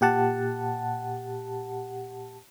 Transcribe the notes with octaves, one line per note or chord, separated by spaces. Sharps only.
A#2 G4 F#5 A5